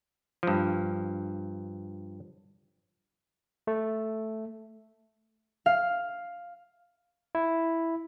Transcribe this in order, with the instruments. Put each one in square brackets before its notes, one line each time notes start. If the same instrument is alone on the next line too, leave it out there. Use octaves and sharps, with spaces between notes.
[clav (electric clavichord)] G2 F3
[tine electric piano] A3
[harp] F5
[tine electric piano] E4